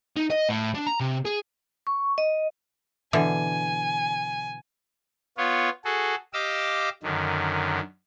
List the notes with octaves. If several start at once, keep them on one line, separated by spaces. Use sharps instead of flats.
D#4
D#5
A2
D4
A#5
C3
G#4
C#6
D#5
B2 D3 E3 G#5
B3 F4 C#5
F#4 G#4 A4
G4 D#5 F5 D6 E6
F#2 D3 D#3